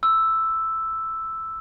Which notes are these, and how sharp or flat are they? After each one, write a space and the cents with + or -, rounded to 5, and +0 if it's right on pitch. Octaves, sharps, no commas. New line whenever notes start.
C6 +0 E6 +0